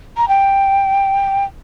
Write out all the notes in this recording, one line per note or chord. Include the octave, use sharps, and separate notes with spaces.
A#5
G5